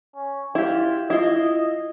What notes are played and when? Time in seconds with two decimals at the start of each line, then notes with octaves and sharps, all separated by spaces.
0.15 C#4
0.55 E4 F4 G4
1.10 E4 F4 D#5